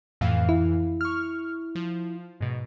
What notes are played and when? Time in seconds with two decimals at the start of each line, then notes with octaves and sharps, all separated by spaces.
0.21 F2 A2 E3 F5
0.49 E4
1.01 C#6 F6
1.75 F3
2.41 G#2 B2